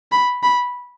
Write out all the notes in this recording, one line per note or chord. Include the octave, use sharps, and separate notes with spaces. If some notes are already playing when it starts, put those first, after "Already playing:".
B5
B5